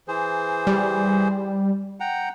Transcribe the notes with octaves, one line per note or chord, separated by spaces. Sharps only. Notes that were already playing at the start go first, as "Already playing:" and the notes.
E3 G#4 C5
G3
F#5 G5 A#5